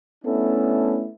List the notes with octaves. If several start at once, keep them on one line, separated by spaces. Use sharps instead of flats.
A3 B3 C#4 D4 E4 A4